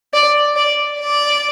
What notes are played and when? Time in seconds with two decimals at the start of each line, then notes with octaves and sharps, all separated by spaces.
0.14 D5
0.56 D5
1.00 D5